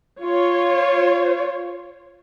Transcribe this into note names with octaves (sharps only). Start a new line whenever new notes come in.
F4 C#5